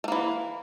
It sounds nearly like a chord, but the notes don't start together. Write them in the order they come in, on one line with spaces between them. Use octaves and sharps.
A3 A#3 E3